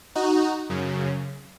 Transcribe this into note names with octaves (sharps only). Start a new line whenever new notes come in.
D#4 F#4
F#2 C#3